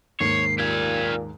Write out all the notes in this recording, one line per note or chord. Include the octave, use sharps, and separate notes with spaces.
D#2 G#2 A#3 C#5 C7
A#2 G4 F5 G#6